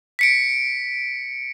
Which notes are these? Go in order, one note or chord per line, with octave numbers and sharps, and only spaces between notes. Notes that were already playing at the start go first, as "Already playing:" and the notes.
B6 C#7 D7